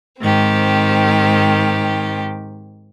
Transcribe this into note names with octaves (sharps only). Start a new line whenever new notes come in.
G#2 D#3 C4 G4